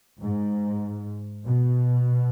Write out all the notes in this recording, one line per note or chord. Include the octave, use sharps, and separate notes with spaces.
G#2
B2